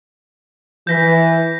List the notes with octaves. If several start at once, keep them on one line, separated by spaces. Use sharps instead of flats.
E3 G6 A#6 B6